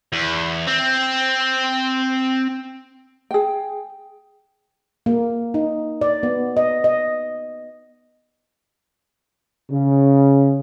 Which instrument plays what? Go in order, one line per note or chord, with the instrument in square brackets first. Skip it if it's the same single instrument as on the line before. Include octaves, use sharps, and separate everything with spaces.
[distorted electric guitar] E2
C4
[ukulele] G#4 G5
[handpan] A#3
D#4
D5
B3
D#5
D#5
[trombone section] C#3